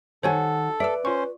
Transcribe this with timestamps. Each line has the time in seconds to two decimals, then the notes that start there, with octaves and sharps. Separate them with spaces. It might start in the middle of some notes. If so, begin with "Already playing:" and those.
0.23 D#3 F#4 A4 C5 C#5 G#5
0.80 B4 D5 E5 E6
1.05 C#4 F4 C5 C#6